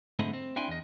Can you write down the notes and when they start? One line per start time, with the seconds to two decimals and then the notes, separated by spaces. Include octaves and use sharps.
0.19 G#2 D3 A3 C4 E4 D#5
0.33 C4
0.56 C4 D4 E4 G5 G#5 C6
0.68 E2 D#5